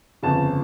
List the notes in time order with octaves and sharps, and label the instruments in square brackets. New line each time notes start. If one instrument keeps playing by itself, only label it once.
[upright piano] G1 F2 C#3 A5